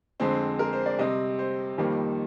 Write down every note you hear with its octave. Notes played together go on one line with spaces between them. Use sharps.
F2 D3 G#3 C4 C5
A#4
C5
D5
C3 G3 C4 D#5
C5
F2 D#3 G3 A#3